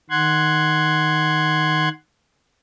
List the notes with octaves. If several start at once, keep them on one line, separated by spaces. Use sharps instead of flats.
D#3 F#5 C6 F#6 G#6